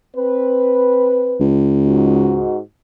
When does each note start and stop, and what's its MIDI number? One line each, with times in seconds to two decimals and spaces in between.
0.16 1.54 60
0.16 1.54 71
1.40 2.46 37
1.84 2.59 44
1.84 2.59 63
1.84 2.59 66